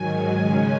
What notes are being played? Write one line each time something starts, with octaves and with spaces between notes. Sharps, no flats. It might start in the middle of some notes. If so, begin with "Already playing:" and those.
Already playing: G#2 D#3 F#3 G#5
C#3 G#3 C#4